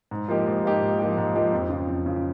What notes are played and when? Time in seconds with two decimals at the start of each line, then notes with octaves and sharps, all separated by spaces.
0.11 G#2
0.28 F3 A#3 D#4 G4
0.46 G#2
0.64 F3 A#3 D#4 G4
0.81 G#2
0.99 F3 A#3 D#4 G4
1.17 G#2
1.35 F3 A#3 D#4 G4
1.53 F2
1.70 C#3 F3
1.88 F2
2.06 C#3 F3